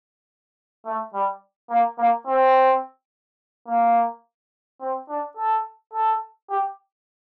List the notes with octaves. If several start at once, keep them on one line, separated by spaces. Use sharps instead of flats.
A3
G3
A#3
A#3
C4
A#3
C4
D4
A4
A4
G4